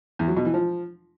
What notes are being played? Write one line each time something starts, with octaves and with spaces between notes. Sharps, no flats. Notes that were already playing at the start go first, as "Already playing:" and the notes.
E2
F#3
B2
E3
F3